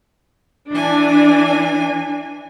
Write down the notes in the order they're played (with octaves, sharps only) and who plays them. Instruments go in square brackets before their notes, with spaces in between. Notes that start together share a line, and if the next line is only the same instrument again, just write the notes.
[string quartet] E3 G#5 [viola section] D4